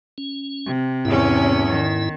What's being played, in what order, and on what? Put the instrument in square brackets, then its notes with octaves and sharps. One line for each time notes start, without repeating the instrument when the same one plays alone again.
[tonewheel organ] C#4
[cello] C3
[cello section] E2 C#4 [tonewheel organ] G#2 E4
[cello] D#3